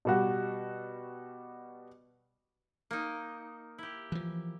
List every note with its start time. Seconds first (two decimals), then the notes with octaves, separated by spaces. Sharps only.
0.05 B2 G3 F#4
2.91 A#3 D#4
3.78 E4 G4
4.12 E3 F3